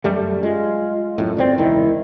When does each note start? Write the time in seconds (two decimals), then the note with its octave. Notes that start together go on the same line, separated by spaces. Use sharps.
0.04 F#2 G3 A3
0.43 G#3 F4
1.18 F#2 A2
1.37 G1 D3 C4 D5
1.58 E1 C#2 D#3 E4